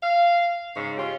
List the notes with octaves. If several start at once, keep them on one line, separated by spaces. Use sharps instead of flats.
F5
G#2 C#3 C#4
C#4 F4 G4